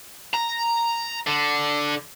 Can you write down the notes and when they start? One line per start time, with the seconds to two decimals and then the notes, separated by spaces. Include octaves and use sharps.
0.34 A#5
1.27 D3